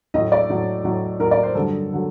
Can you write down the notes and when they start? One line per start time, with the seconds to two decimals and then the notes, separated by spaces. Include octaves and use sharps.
0.14 A2 D#5
0.17 F#3
0.32 D5
0.50 A2 F#3
0.84 A2 F#3
1.20 A2 F#3 A#4
1.31 D5
1.43 C5
1.55 G2 D3 F#3 A4
1.93 D3 F#3